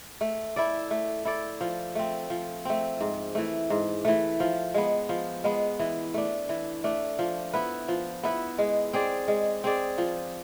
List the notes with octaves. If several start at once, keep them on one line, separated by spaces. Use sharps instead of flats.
A3
E4 A4 D5
A3
E4 A4 D5
F3
A3 C4
F3
A3 C4
G#2
E3 A3
G#2
E3 A3
F3
G#3 B3
F3
G#3 B3
E3
A3 D4
E3
A3 D4
F3
B3 E4 B4
F3
B3 E4 B4
G#3
C4 G#4 D5
G#3
C4 G#4 D5
F3